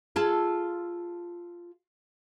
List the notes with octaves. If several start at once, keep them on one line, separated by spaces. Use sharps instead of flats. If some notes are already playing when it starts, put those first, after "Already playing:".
F4 G#4 A4